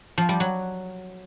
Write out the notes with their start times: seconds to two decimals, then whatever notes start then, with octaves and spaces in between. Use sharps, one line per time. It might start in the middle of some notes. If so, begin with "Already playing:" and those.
0.18 F3
0.29 G3
0.40 F#3